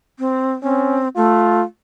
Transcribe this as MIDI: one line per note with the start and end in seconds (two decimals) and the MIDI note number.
0.19 0.53 60
0.63 1.08 60
0.63 1.00 61
1.16 1.61 57
1.16 1.63 65